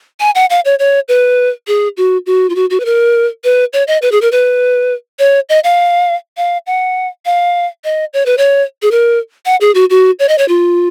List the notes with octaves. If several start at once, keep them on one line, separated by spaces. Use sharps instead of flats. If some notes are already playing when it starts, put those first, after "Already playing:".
G#5
F#5
F5
C#5
C#5
B4
G#4
F#4
F#4
F4
F#4
F#4
B4
A#4
B4
C#5
D#5
B4
G#4
A#4
B4
C#5
D#5
F5
F5
F#5
F5
D#5
C#5
B4
C#5
G#4
A#4
F#5
G#4
F#4
F#4
C#5
D#5
C#5
F4